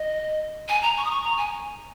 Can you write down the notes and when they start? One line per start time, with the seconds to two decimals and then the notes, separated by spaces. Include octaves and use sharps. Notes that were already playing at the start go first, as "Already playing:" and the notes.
Already playing: D#5
0.69 G#5
0.82 A#5
0.97 C#6
1.04 D#6
1.10 C#6
1.24 A#5
1.37 G#5